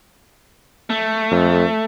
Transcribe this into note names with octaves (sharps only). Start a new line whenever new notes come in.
A3
F2